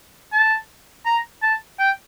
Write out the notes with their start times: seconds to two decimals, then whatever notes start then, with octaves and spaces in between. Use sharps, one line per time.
0.32 A5
1.06 A#5
1.43 A5
1.79 G5